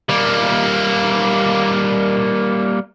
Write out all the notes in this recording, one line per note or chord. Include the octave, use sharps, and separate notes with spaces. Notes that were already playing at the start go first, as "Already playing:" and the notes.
G3 A#3